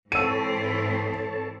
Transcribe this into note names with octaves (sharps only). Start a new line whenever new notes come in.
G#2 E3 C4 A4 C#5 A5 E6 D#7